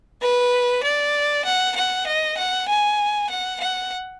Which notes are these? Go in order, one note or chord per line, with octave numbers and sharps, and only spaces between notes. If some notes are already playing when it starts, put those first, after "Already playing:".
B4
D5
F#5
F#5
D#5
F#5
G#5
F#5
F#5